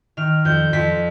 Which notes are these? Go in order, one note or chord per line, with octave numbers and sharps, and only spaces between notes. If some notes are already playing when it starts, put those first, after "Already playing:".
D#3 F6
F2 G6
F2 B6